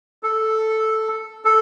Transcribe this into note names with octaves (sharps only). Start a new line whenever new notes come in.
A4
A4